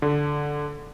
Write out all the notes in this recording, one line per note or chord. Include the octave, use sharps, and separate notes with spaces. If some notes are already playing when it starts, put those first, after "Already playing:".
D3